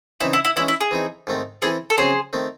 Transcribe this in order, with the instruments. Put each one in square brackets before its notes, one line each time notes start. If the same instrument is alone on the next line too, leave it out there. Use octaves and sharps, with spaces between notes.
[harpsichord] C#3 E3 C4 D#4 G#4 [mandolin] E4
[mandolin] E4
E4
[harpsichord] E3 G#3 C#4 [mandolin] E4
[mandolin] E4
G#4
[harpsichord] E3 C4 D#4
G#2 D#3 A3 C4
[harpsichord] E3 C4 E4 A4 [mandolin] G#4
[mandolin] A4
[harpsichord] C#3 F#3 C4 [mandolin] G#4 C5
[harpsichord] D#3 A3 C4